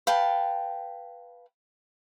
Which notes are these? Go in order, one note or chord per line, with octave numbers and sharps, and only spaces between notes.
B4 F5 G5 A5